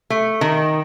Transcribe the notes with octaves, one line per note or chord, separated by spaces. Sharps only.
A3
D#3